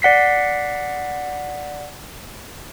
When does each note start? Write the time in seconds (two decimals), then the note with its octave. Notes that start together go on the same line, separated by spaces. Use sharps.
0.02 D5 F#5 B6 C7